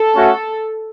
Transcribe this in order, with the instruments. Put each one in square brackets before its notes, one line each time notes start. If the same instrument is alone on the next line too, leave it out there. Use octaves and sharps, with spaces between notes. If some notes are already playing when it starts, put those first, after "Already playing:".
Already playing: [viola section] A4
[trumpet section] A3 C#4 F#4